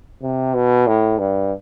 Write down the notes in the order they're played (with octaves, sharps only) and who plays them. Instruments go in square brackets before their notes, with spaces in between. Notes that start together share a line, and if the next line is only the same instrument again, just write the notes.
[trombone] C3
B2
A2
G2